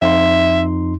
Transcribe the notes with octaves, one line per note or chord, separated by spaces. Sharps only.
F2 D#4 E5 C6